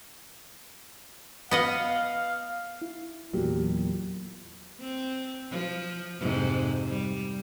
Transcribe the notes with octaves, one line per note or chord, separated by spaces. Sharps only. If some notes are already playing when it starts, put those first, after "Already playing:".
B3 D#5 F5 F#5
E4
E2 A#2 F#3 G4
C4
F3
F2 G#2 C3
G3